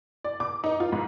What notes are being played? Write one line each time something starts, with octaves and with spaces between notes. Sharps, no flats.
D5
D6
D#4
F4
G#2